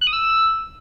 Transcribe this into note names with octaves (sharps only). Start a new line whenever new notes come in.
F#6
D#6
E6